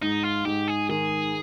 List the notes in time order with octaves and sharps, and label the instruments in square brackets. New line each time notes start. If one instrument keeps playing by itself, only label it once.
[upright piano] G#2 [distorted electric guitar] D#4
[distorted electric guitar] F4
[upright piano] G#2 [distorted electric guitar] G4
[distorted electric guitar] G#4
[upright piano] D#3 [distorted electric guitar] G#4